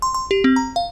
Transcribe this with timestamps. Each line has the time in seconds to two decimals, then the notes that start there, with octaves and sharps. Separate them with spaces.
0.02 C6
0.14 C6
0.31 G4
0.44 C4
0.56 A#5
0.76 F5